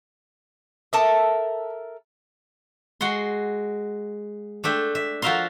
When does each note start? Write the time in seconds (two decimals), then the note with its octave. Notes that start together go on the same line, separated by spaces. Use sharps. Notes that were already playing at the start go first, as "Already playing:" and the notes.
0.93 A4 A#4 E5 A5 D6 D#6
3.01 G#3 F#4 F#5 C6
4.64 A3 D4 E5 G5
4.95 E5
5.22 F3 F#4 A#4 E5 F5 C6